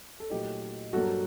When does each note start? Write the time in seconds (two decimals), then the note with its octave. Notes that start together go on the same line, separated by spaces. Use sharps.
0.20 A4
0.30 A#2 F#3 A3 D#4 G4
0.93 G2 F#3 A#3 F#4 A4